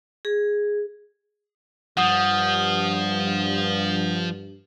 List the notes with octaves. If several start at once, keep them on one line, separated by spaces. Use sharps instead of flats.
G#4
G2 F3 F#5 D#6